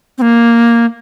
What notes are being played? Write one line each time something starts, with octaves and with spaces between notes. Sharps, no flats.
C4
A#3